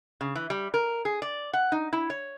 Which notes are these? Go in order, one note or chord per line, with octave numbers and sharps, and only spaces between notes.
C#3
E3
G3
A#4
G#4
D5
F#5
D#4
E4
C#5